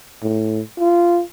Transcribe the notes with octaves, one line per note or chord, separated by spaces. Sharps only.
A2
F4